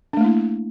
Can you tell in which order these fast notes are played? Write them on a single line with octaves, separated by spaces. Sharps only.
D4 A3 A#3 E4